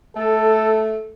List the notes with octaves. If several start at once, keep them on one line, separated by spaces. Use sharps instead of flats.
A3 A4